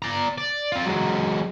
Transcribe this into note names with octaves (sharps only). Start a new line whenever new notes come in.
D5 A#5
D5
C4 F4
F#3 G#3